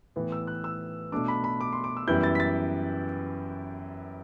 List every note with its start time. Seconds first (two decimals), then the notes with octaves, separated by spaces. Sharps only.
0.16 A2 E3 B3
0.32 E6
0.47 F#6
0.64 E6
1.12 B2 A3 D4 D6
1.28 B5
1.44 B5
1.61 D6
1.73 C6
1.84 D6
1.97 E6
2.08 F#2 E3 G3 B3 E4 G6
2.23 A6
2.35 B6
2.40 A6